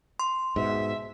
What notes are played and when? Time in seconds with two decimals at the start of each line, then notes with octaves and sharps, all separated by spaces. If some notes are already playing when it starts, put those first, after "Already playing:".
0.19 C6
0.56 G#2 B2 E5